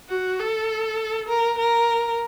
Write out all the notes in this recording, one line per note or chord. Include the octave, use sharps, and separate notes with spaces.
F#4
A4
A#4
A#4